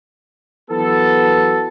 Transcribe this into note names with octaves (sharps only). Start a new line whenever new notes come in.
E3 F#3 B3 F#4 A4